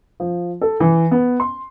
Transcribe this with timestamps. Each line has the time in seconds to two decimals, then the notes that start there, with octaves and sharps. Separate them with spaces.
0.20 F3
0.61 A4
0.80 E3
1.11 B3
1.40 C6